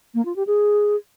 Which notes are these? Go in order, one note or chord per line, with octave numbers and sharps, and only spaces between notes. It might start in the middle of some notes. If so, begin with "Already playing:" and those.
A#3
F4
G4
G#4